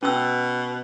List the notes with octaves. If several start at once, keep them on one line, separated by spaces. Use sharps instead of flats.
B2 C#4 E6